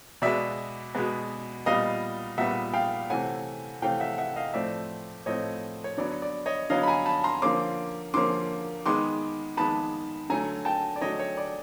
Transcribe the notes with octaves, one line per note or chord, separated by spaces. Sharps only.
B2 G#3 B3 D5 E5
B2 G#3 B3
A#2 G3 B3 D#5 F5
A#2 G3 B3 E5 F#5
F5 G5
C3 E3 A3 C#4 F#5 G#5
C3 E3 A3 C#4 F5 G5
E5 F#5
E5 F#5
D#5 F5
A2 F3 A3 C4 D5 E5
A2 F3 A3 C4 C#5 D#5
C#5
D3 F#3 B3 D5
D5
C#5 D#5
D3 F#3 B3 D#5 F5
B5
G#5 A#5
A5 B5
A#5 C6
D3 F3 A#3 C#4 C6 D6
D3 F3 A#3 C#4 C6 D6
D#3 G#3 B3 C6 D6
D#3 G#3 B3 A5 B5
D3 F#3 A3 G#5 A#5
G5 A5
D5
D3 F#3 A3 C#5 D#5
C#5
D5